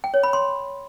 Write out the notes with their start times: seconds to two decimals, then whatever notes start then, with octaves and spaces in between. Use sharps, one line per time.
0.04 G5
0.14 C#5
0.23 B5
0.33 C6